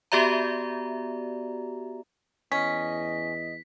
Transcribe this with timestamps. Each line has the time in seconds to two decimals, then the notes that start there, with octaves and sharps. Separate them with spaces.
0.12 B3 F#4 G4 D5 E5 A#5
2.52 E2 C#4 D#5 B6